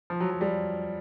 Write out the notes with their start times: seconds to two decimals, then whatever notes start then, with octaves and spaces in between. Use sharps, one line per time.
0.10 F3
0.20 F#3
0.30 F#3
0.41 G3